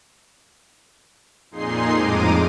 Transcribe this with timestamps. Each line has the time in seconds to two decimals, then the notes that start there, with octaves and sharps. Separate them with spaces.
1.51 F2 A#2 D#4 G#4 C6 C7
1.95 F2 A2 G#3 A#5 D6 D#7